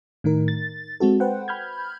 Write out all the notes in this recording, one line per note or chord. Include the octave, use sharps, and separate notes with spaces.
A2 D#3 D#4 A#4
A6
G#3 C4 F#4 A4
B4 C5 F#5 G5
B5 F6 G6 G#6